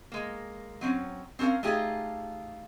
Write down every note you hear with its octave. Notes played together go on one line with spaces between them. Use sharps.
G#3 A#3
F#3 C4 C#4
C4 C#4 A4 A#4 F5
A3 D#4 F4 G4 G#4